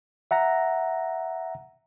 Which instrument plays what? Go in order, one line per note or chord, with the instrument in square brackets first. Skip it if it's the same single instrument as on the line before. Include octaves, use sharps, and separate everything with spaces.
[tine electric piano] E5 F#5 A#5 A#6